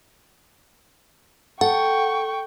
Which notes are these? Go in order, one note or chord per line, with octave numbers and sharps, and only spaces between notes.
A4 F#5 G5 C#6